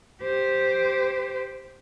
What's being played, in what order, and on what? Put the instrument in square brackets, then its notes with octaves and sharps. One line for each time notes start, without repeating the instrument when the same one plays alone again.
[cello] G4 C5